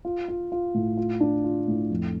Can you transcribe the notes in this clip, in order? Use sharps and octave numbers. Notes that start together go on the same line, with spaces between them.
F4
F4
F4
A2
F4
D4
F4
A2
F2